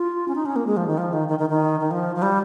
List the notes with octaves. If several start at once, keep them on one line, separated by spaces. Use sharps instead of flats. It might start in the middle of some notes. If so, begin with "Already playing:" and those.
Already playing: F4
C#4
D#4
C#4
A#3
G#3
F3
D#3
F3
D#3
D#3
D#3
D#3
D#3
F3
F3
G3